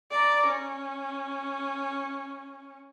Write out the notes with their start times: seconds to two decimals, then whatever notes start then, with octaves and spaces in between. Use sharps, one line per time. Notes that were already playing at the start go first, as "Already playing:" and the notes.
0.11 D5 A#5
0.48 C#4